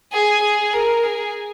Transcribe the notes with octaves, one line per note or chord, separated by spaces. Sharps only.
G#4
G#4
A#4
G#4